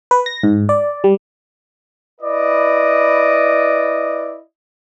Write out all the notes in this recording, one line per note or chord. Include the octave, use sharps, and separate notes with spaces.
B4
A#6
G#2
D5
G3
E4 B4 D5 D#5